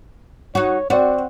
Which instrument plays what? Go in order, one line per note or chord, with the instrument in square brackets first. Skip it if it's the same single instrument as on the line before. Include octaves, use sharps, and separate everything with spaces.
[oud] D#4 F#4 [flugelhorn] C#5
[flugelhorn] C4 [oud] F#4 [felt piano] D5